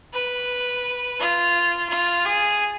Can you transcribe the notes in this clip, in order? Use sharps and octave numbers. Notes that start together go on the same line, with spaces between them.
B4
F4
F4
G#4